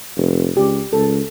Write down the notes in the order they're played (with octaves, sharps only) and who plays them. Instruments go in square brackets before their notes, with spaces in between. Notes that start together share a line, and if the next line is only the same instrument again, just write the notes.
[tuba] F1
[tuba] C#2 [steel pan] G4
[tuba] C#2 [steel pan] A4